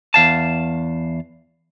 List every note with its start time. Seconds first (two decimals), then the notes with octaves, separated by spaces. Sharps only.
0.14 E2 F5 A5